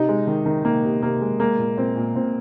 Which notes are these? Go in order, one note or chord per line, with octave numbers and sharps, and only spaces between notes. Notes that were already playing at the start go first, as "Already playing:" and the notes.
Already playing: C3 D#4
G#3
D#3
D#3
D#3 A#3
C3
C3 A#3
G#3
G#3 A#3
A#2
A#2 C4
A#2
A#2 C4